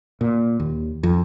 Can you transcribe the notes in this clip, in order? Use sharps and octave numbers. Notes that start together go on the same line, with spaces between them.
A#2
D#2
F2